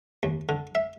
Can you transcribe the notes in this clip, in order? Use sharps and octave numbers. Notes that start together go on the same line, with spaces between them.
D#2
D3
E5